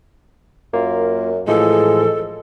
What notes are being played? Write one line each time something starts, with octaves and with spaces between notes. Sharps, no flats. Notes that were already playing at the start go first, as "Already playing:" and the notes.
F#2 A#3 F4
A2 E3 F3 G#3 A4